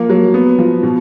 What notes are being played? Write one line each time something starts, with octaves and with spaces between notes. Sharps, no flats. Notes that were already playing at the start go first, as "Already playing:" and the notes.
Already playing: F3 A#3
F#3
B3
F3
B2